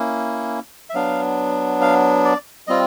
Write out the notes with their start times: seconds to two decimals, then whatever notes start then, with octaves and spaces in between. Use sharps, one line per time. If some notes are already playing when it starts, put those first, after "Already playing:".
Already playing: A#3 C#4 E4
0.90 E5
0.94 F#3 B3 D4 F5
1.81 F5
2.25 D5
2.67 G3 C4 F4 D#5